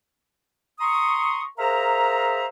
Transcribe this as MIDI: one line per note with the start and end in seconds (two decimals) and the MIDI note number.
0.80 1.44 82
0.80 1.44 84
0.80 1.44 85
0.80 1.44 87
1.59 2.46 68
1.59 2.46 70
1.59 2.46 72
1.59 2.46 76
1.59 2.46 77
1.59 2.46 82